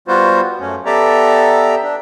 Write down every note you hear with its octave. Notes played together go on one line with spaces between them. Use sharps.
G3 B3 F4 F#4 C5
F#2 A3 C#4
B3 G4 A4 D5 E5 A#5
D4